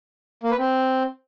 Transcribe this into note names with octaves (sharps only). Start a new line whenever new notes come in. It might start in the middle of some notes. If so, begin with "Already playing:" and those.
A#3
B4
C4